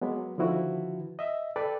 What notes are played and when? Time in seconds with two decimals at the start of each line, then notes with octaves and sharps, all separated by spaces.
0.01 F#3 G#3 A#3 B3
0.38 D3 D#3 F3 E4 F#4 B4
1.19 D#5 E5
1.56 A4 B4 D5 G5